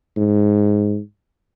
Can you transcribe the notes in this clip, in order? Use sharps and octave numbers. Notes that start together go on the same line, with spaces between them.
G#2